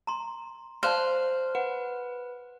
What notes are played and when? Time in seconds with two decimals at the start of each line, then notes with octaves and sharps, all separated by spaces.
0.07 A#5 C6
0.83 C5 D5 F5 A5 F6 F#6
1.55 B4 F#5